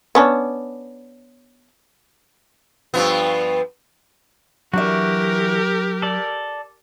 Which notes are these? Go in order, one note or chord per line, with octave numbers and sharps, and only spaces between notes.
B3 C#4 D4
G2 F3 B3
E3 F#3 D4 F#4 G4 A#4 E5
A4 D5